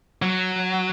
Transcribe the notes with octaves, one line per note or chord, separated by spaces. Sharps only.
F#3